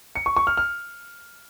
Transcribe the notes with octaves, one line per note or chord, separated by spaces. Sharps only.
C#7
C#6
C#6
F6
F6